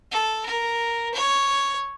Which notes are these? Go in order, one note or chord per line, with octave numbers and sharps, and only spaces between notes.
A4
A#4
C#5